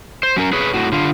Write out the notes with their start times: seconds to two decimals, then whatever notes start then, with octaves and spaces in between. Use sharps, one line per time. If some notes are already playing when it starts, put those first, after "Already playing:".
0.23 C5
0.36 F#3 C#4 A#4
0.53 G#4 B4 C#5
0.74 A2 F#4
0.92 D3 F4